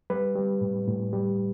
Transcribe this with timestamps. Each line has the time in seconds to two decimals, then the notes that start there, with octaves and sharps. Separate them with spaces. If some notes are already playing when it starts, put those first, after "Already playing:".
0.10 G3 B4
0.36 G3
0.61 A2
0.88 A2
1.13 G3